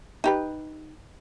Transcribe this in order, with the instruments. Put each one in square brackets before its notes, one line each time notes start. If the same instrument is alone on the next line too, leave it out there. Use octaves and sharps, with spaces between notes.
[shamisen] D#4 G4 B4